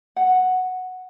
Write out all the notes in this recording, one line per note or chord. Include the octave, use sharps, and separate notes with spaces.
F#5